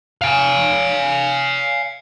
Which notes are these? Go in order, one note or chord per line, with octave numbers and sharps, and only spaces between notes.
F5 G#5